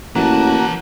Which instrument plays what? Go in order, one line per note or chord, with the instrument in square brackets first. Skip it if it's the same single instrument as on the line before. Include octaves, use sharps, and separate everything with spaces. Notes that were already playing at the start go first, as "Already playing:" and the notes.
[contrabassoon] A1 [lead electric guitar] E3 A5 [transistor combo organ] A#3 F#4